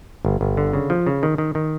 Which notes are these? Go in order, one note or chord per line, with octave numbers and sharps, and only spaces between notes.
G1
G1
D3
C#3
F3
C#3
D#3
D#3
D#3